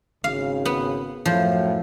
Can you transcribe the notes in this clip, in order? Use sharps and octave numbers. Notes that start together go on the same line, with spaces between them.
G#1 C#3 F5
B3
F#2 A2 F3